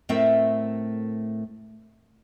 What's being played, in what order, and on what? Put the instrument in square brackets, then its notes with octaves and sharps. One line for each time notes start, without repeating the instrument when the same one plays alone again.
[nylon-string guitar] A2 A3 C4 A4 A#4 E5